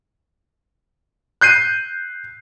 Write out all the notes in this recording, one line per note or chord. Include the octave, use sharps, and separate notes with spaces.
F#6 G6 C7 D#7